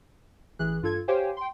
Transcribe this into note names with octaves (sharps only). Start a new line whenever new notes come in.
A1 E3 G#4 F#6
G2 F4 A4 G#6
G4 C5 C#5 F5 G5 G#5
G5 C6